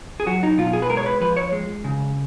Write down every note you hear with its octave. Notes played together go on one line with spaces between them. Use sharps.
G#4
F#3 F#4
D#4
B2 F4
G#4
B4
G#3 A#4
C#5
B4
F3 B4
C#5
G#3
C#3